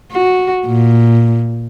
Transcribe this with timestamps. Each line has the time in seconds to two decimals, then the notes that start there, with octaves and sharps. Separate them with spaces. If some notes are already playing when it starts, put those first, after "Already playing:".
0.12 F#4
0.66 A#2